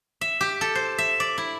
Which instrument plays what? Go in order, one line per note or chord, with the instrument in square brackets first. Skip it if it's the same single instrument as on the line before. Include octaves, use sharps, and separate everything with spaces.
[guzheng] E5
G4
A4
C5
E5
D5
E4